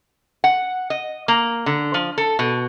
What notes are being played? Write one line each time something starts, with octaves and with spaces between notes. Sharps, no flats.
F#5
D#5
A#3
D3
F3
A4
B2